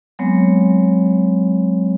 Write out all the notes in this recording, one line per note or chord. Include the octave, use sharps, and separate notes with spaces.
F#3 G#3 B3 C4 C#5